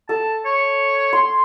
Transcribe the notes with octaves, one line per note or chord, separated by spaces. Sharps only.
A4 A5
C#5
C6